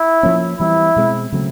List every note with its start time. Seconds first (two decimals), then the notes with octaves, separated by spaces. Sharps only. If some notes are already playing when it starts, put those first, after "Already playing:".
Already playing: E4
0.23 F3 A#3 C#4
0.59 E3 G3 C4 E4
0.96 B2 G#3 C4
1.32 C#3 F#3 A3 C4